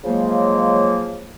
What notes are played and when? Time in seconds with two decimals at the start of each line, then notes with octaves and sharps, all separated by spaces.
0.04 C#3 F3 F#3 G#3 A#3